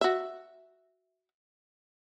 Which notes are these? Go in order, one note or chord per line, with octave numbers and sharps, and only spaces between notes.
F#4 E5